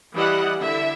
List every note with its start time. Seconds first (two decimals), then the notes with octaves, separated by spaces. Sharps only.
0.12 E3 G3 E4 D#5 F#5
0.59 D3 E4 E5